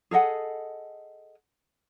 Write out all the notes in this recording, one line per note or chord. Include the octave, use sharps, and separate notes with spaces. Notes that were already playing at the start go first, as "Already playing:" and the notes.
G#4 A4 D#5 F#5